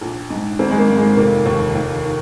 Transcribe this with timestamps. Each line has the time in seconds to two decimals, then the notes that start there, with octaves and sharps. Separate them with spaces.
0.01 A#1
0.30 G#2
0.59 G#1 C4
0.71 G#3
0.78 A#3
0.88 G#2
0.97 G#3
1.17 F1 A#3
1.46 D#2
1.75 D#2
2.04 D#3